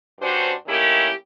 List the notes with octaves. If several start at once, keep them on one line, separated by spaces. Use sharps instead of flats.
G2 C#4 D4 F#4 C5
D#3 A3 A#3 C#4 E4 G4